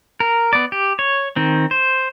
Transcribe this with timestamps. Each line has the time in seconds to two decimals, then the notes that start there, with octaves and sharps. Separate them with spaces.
0.20 A#4
0.53 B3 D5
0.72 G4
0.99 C#5
1.36 D#3 C4
1.71 C5